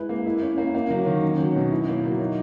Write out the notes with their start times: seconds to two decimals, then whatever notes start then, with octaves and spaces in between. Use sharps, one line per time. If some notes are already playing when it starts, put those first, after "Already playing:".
Already playing: G#3 E4 B4
0.09 A#3
0.26 E4
0.42 C#4
0.58 A#3
0.75 A#3
0.90 F#3
1.06 D#3
1.22 C#4
1.39 F#3
1.55 B2
1.71 E4
1.88 A#3
2.04 F#3
2.20 D#4